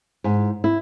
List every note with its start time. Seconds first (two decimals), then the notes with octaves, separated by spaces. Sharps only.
0.24 G#2
0.64 E4